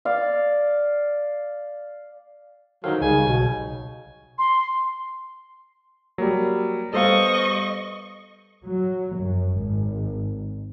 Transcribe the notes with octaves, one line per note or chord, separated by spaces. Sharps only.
D5 F5
D#3 F#3 D#4 A4 C5 F5
C#2 C#3 G3 G#5
B1 B2 F#3 C#5
C6
F#3 G3 A#3 G4
G3 B3 A4 C5 D#5 F5 C#6
F#3
F#2
G#1